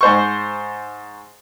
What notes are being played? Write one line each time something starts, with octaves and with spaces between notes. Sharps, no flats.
G#2 C5 C#6